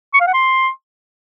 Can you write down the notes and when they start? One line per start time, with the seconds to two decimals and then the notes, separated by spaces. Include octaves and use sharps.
0.14 C#6
0.20 F5
0.27 F#5
0.34 C6